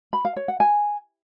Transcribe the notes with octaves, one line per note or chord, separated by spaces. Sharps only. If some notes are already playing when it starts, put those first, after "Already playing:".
B5
F5
C#5
F#5
G#5